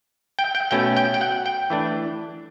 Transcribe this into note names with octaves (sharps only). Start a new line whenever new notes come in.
G5
G5
B2 A3 C#4 G5
G5
G5
F#5
G5
E3 A3 D4